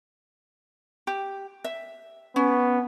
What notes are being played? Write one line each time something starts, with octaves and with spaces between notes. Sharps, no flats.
G4
E5
B3 C#4